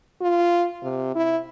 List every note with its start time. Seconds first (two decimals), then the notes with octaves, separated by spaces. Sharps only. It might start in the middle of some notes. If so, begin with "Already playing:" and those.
0.21 F4
0.83 C3
1.15 E4